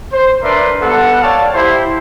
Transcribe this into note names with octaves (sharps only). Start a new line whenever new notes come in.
C5
D4 A#4 B4 D5 E5 C6
G3 B3 A4 F#5
C#5 D5 F5 G5 A5
E4 G4 C5